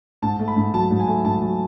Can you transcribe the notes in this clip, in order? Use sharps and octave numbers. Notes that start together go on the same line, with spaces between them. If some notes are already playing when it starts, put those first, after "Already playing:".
G#2 A5
A3
B5
G#2
F#3 A5
G#2
G#5
A3
G#2 A5
F#3